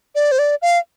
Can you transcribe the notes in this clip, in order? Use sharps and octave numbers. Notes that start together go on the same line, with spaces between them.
D5
C5
D5
F5